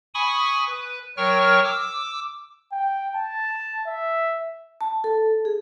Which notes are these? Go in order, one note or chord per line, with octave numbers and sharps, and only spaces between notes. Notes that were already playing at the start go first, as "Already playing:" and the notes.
G#5 B5 C#6 D#6
B4
F#3 A#4 C#5 G5 C#6 F6
D6 E6
G5
A5
E5
A5
A4
G#4